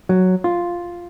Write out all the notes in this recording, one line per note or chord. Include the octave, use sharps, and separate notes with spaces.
F#3
F4